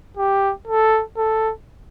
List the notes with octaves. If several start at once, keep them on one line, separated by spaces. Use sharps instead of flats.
G4
A4
A4